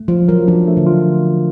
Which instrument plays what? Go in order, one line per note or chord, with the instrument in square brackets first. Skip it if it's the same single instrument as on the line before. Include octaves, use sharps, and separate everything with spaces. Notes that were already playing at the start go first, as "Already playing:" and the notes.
Already playing: [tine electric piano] A3
[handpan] F3 [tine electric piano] F4
[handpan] F#3 [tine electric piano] A#4
[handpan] F3 [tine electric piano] D4
[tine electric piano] A3
[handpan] D3
[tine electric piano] F4